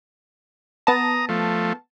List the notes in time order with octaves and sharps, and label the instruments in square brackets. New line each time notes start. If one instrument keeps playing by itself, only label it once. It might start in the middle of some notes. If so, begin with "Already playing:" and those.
[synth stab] B3 A5 [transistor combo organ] A#5 D#6
[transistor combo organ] F3 A3